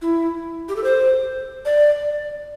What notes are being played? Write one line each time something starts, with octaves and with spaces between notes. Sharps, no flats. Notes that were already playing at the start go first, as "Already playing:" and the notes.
E4
G4
A4
C5
D5